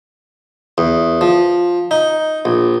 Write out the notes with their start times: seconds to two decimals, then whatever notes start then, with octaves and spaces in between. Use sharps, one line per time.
0.78 E2
1.21 F3
1.91 D#4
2.45 A#1